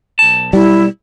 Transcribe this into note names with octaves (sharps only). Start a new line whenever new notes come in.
B1 A5
G3 E4